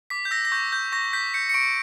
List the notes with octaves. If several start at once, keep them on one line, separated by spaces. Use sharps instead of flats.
D6 B6
G6
E6 A#6
A#6
C#6 G6
G6
C#6 A#6
G6 B6
G6 C#7
C#7
C#6 D7